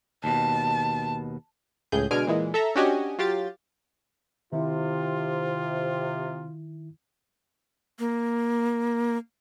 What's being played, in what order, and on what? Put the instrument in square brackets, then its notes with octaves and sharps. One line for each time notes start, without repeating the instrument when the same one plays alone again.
[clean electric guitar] D#2 B2 [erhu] A5
[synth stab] C#2 A2 G#4 G6
B2 D3 G#3 G#5 F6 D7
A#2 E3 G#3
A4 E5 A#5
C#4 D4 F#4 G4 D#5 G#5
F#3 F4 G4 A6
[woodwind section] C3 [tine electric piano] D#3 E4 [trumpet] F4
[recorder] A#3